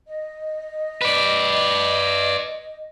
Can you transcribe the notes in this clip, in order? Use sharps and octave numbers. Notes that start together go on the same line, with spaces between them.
D#5
B4 D5